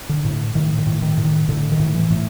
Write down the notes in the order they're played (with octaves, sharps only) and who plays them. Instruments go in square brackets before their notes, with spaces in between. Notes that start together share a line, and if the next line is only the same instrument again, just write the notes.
[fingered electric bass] D3
A2
A2 D#3
D#3
A2
D#3
A2
D#3
A2 D3
D#3
A2
E3
A2